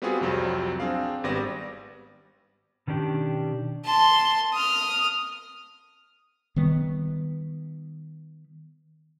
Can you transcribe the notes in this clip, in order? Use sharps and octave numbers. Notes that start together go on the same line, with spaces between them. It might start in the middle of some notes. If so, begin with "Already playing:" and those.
G3 B3 C4 F4 F#4 G#4
C2 F2 F#3 G3 C4
C4 D4 G#4 F5
G#1 G3 B3 D5 A#6
B2 D#3 C#4 D4 G4
A5 C6
D#6 F6
D#3 G3 B3